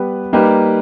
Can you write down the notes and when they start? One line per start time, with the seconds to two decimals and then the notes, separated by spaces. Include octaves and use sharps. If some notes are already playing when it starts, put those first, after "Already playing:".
Already playing: G3 B3 G4 B4
0.33 G3 A#3 D#4 G4 B4